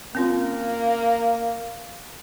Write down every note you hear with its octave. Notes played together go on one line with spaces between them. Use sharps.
A#3 C4 C#4 F4